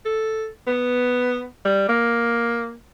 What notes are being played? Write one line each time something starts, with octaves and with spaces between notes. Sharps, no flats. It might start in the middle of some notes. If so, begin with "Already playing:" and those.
A4
B3
G3
A#3